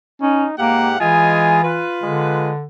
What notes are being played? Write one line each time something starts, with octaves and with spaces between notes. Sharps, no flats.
C#4 D#4
G#2 A#3 G4 F5 F#5
E3 G#3 F4 D#5 G#5
F4 B4
D3 G#3